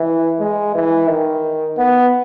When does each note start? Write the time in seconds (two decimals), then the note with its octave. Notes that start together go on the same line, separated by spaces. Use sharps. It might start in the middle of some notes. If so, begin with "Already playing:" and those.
Already playing: E3
0.39 G#3
0.75 E3
1.08 D#3
1.77 B3